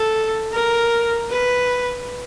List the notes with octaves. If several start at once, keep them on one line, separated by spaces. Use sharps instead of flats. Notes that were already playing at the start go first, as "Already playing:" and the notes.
Already playing: A4
A#4
B4